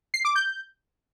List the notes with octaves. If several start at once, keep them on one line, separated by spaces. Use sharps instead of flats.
C7
D6
G6